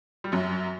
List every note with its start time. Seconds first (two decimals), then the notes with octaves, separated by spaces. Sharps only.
0.24 G3
0.32 F#2 F#3